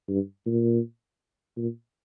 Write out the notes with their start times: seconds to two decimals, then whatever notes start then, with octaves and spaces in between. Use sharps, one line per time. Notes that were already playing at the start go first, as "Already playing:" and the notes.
0.09 G2
0.46 A#2
1.57 A#2